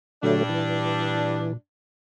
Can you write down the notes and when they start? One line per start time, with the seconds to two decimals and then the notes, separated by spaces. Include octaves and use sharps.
0.23 G2 A#2 D3 F#3 A3 D4
0.49 E3